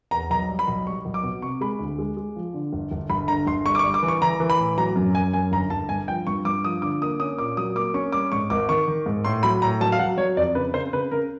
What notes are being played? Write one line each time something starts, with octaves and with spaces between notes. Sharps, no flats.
E2 A#5
B1 A#5
G3
B5
B1
G3 C#6
B1
D6
B2
C3 C#6
G#3 B5
D2
G#3
G#3
F3
D3
G1
G1
G1 B5
D3 A#5
G1 C6
G3 C#6
D6
C#6
G3
D6
E3
C#6
E3 A#5
E3
B5
A2
F#3 A#5
F#2
F#2 G#5
F#2 G#5
G1 A#5
G1 A5
G2 G#5
F3 G5
G2 C#6
G2 D6
F3 D#6
D3 D6
A#3 D#6
C#4 D#6
A#2 D6
F#3 D#6
A#3 D6
C#4 C#6
G3 D6
G#2 C#6
G#1 D6
D#3 C#6
D#3
G#2
A2 C6
F#3 B5
A2 A#5
F#3 A5
F5
F#3 F#5
F#3 C#5
F2 D5
C#3 B4
C#3 C5
C#3 B4
C#3 A#4